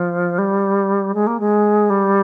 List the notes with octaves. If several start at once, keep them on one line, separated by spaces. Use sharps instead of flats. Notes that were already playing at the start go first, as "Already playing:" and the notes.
Already playing: F3
G3
G#3
A#3
G#3
G3